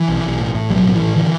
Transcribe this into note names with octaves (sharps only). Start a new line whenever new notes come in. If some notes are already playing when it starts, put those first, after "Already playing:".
Already playing: E3
B1
B1
A2
A2
B1 F#3 G3
A2
E3
A2
D3 E3